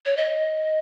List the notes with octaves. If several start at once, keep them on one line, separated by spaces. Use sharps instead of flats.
C#5
D#5